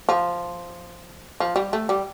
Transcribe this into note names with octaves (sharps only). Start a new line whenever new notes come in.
F3
F3
G3
A3
G3